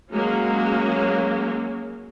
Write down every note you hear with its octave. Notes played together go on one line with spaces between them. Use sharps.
F#3 G#3 A#3 C#4